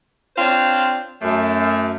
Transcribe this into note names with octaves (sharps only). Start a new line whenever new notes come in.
C4 D4 F4 C5 C#5
F#2 A3